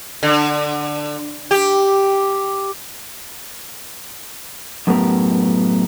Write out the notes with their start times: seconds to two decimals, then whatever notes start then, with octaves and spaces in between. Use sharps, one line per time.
0.23 D3
1.51 G4
4.87 F#2 A2 B3 G4 A#4